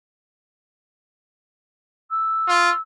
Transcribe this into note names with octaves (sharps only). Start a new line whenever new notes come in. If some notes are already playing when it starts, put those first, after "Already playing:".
E6
F4